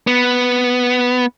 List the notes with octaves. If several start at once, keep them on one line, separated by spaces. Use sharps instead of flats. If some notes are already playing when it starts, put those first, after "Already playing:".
B3